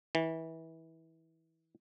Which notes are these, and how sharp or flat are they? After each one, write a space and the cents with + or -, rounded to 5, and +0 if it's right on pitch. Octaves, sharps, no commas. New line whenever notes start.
E3 -25